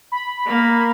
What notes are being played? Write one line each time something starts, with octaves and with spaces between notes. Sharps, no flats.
B5
A#3